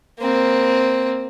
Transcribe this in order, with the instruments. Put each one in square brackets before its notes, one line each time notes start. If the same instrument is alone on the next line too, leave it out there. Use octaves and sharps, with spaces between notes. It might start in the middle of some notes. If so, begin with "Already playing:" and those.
[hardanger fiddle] A#3 C4